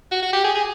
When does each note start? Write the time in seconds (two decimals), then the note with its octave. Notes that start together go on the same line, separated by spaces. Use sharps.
0.12 F#4
0.23 F#4
0.33 G4
0.45 G#4
0.55 G#4